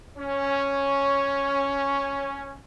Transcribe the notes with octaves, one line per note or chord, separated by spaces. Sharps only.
C#4 C#5